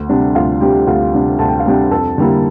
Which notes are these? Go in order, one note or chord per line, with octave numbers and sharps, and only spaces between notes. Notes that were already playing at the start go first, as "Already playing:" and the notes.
Already playing: D2
C3 G3 D4
D2 F4 F5
C3 G3 D4 G4 G5
D2 F4 F5
C3 G3 D4
D2 A5
G5
F5
C3 G3 D4 G4 G5
F2 A4 A5
D3 G3 A#3 E4